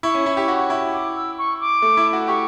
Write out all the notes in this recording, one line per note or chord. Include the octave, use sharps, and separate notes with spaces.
E4 C#6
C#4
E4
G4
F#4
E4
D6
E6
C#6
D6
A3
E4
F#4
G4 C#6